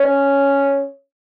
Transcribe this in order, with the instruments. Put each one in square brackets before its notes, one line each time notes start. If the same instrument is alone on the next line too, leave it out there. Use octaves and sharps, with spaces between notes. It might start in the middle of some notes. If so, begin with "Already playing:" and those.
Already playing: [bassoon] C#4